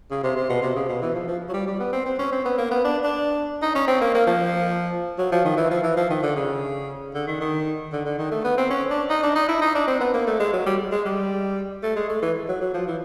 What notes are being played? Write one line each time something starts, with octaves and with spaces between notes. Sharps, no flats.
C#3
C3
C3
B2
C3
C#3
B2
E3
F3
F3
F#3
G3
G3
B3
C4
C4
C#4
C4
B3
A#3
B3
D4
D4
D#4
C#4
C4
A#3
A#3
F3
F#3
F3
D#3
E3
F3
E3
F3
D#3
D3
C#3
D3
D#3
D#3
D3
D3
D#3
A3
B3
C4
C#4
D4
D#4
D4
D#4
E4
D#4
D4
C4
B3
A#3
A3
G#3
F#3
G3
G#3
G3
A3
G#3
A3
E3
F#3
F#3
F3
E3